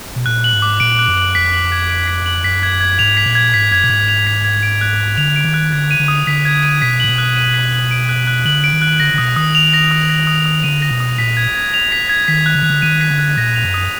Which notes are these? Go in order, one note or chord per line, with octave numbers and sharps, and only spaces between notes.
B2
A#2 F#6
F#7
G#2
D6
A#2 D7
F#6
F#2
F#7
F2 B6
F#7
G#6
D7
B6
F#7
F#2 B6
G#6
G#6
G#2 F7
B6
A#2
G#6
G#2 B6
F#2 G#6
A#2
G#2 G#6
F7
B6
G#6
D7
F#6
F#6
D3 F7
D7
D#3
F#6
D3 G#6
D#7
D3
D#6
D3 B6
G#6
D#7
B2 B6
A#2 F#7
B2
F#6
D#7
B6
F#7
D7
F#6
F#6
D3 F#7
D7
D#3
F#6
D3 A#6
D3
B2 D#6
D#3 D#6
F7
A#6
D#6
A#6
D#6
D#6
D3 D#7
A#6
B2
D#6
A#2 B6
G#6
G#6
F7
B6
G#6
D#3 B6
F#6
D3
D#3 F#6
D3
D#3 D#7
B6
D3
F#6
A#2 A#6
F7
F#2
D#6